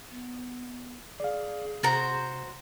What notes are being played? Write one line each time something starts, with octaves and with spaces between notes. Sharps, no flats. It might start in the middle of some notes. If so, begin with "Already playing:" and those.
B3
G#4 D5 F5
C3 F#4 C5 A#5 A6